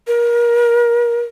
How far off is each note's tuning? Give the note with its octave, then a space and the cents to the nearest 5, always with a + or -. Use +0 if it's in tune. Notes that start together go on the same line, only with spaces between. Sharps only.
A#4 +30